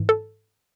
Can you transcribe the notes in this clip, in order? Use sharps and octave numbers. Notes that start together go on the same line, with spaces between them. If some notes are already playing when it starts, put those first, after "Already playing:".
Already playing: G#2 E3
A4